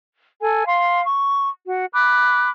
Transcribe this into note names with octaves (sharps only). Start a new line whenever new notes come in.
A4 G#5
F5 C6
C#6
F#4
B5 D6 F#6